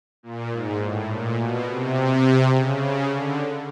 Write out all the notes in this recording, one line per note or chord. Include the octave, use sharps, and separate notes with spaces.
A#2
G#2
A2
A#2
B2
C3
C#3
D3